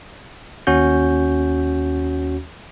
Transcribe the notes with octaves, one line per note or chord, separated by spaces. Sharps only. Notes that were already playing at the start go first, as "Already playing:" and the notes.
D#2 C#4 F#4 G6